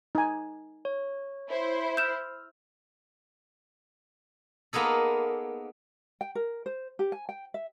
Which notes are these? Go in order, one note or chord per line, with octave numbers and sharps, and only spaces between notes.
D#4 G#5
C#5
E4 C5
E6 F6 G6 E7
A#3 B3 D#4 G#4 A4
G5
A#4
C5
G4
G#5
G5
E5